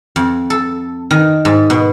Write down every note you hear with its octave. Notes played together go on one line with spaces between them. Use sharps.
F2
A4
D#3
G#2
B2